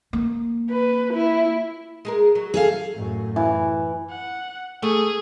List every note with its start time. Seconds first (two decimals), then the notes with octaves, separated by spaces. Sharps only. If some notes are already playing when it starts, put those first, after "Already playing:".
0.13 A#3
0.70 B4
1.13 E4
2.05 G#3 G#4 A#4
2.35 F#3
2.54 G#4 A4 F5
2.93 F#2 A2
3.36 E3
4.10 F#5
4.83 A3 G#4